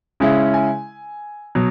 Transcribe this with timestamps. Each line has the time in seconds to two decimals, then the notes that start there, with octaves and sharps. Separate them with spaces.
0.20 C#3 G#3 C#4 E4
0.54 G#5
1.55 B2 F#3